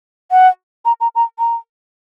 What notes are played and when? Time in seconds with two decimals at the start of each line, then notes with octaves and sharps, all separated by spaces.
0.31 F#5
0.85 A#5
1.00 A#5
1.15 A#5
1.39 A#5